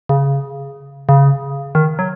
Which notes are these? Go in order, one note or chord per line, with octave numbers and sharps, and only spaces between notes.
C#3
C#3
D#3
F#3